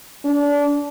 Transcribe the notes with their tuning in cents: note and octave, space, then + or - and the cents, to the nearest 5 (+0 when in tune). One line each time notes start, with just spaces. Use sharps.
D4 -25